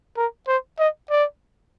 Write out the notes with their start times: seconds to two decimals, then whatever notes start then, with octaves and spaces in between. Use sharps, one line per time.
0.17 A#4
0.48 C5
0.79 D#5
1.10 D5